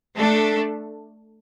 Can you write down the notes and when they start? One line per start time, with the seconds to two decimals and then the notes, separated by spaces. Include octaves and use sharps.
0.16 A3 D4 A4